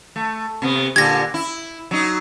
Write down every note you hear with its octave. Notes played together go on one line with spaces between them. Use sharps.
A3
C3 B3
A#2 D3 G4 G#6 A#6
E4
F#3 D#4